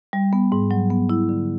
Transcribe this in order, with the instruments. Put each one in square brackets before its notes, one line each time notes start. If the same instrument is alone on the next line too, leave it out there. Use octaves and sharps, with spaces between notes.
[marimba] G3
B3
G#2
F#3
B3
E4
D3